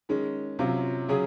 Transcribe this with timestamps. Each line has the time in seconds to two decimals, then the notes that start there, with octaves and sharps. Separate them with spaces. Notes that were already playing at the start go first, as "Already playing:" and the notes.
0.09 D#3 G#3 C#4
0.59 C3 F#3 C#4 F4
1.09 C#3 F#3 C#4 G#4